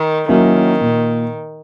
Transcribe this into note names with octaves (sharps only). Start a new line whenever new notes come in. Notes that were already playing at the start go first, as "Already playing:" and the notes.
Already playing: D#3
D#3 F#3 A#3 C#4 E4
A#2